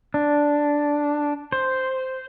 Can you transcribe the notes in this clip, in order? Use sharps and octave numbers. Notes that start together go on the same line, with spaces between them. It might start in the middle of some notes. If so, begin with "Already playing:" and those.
D4
C5